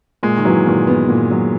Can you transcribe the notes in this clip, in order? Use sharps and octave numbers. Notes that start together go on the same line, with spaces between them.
A#2 G#3
D#3
E3 F#3
A#2 D#3
B3
A#2
F#3